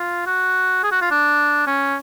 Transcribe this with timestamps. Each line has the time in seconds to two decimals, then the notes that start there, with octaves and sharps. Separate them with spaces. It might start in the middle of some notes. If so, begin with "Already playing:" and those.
Already playing: F4
0.26 F#4
0.83 G#4
0.92 F#4
1.02 F4
1.11 D4
1.67 C#4